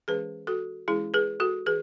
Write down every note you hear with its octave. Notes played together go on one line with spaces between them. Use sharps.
E3 G#3 C#4 G#4 B4
F#4 A4
E3 G#3 C#4 E4 G#4
G#4 B4
F#4 A4
E3 G#4 B4